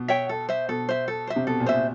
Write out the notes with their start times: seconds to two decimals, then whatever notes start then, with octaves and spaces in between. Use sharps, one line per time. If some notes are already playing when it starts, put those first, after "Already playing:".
Already playing: B2
0.08 C#5 E5 G5
0.29 A4
0.49 C5 E5
0.68 B2 A4
0.89 C5 E5
1.08 A4
1.27 C5 E5
1.36 C3
1.47 B2 A4
1.60 A#2
1.66 C5 E5
1.74 B2